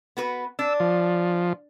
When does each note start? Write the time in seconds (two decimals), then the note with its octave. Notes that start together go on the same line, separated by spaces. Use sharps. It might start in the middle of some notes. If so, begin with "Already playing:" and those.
0.17 B3 F#4 B4
0.59 D4 E6
0.80 F3